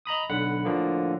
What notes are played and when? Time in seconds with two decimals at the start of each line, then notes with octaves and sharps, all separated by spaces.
0.05 D#5 A#5 B5 D#6
0.30 B1 D3 F#5 B5
0.65 A2 D3 F3 A#3